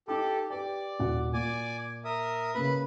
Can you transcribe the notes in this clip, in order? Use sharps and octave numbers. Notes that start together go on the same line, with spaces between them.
D#4 G4 A4 D6
G4 B4 D5 G5
D#1 F#4 F#5
A#2 D5 G#5 D6
A#4 E5 D#6
C#3 A#3 B4 B5